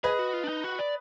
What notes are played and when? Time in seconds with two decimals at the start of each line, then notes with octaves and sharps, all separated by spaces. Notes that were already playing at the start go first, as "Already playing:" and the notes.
0.04 G#4 B4 D#5
0.19 F#4
0.33 F4
0.44 D4
0.49 D#4
0.64 F#4
0.79 D5